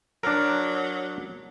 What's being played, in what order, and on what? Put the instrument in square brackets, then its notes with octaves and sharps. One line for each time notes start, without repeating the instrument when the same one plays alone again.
[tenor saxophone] F#3 [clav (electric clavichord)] D4 A#4